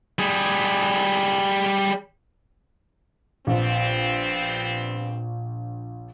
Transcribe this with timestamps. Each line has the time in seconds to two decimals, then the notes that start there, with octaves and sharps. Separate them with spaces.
0.19 G3 G#4
3.47 A#1 G3 B3 C4